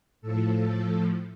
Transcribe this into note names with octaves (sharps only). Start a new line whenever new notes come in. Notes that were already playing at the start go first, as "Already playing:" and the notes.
A2 F3 A4